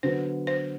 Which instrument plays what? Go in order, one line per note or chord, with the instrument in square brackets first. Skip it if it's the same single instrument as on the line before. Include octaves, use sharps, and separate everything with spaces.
[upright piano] D3 F#3 B3 [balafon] C5
[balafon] C5